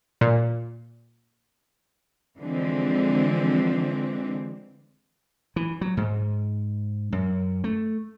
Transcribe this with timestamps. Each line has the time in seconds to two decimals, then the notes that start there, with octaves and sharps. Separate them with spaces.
0.21 A#2
2.38 D3 E3 F3 G#3 C4
5.56 E3
5.81 F#3
5.97 G#2
7.12 F#2
7.64 A3